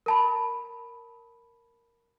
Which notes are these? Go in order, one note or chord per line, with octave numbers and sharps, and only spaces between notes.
A#4 A5 B5